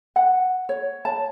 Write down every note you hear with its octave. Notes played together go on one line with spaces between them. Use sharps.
F#5
C#5
A5